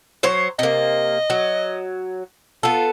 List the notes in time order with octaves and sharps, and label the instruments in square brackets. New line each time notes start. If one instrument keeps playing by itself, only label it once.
[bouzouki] F#3 C5 C#5
[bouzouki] C3 A#3 [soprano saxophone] D#5
[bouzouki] F#3
[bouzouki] B3 A4 [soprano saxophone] F4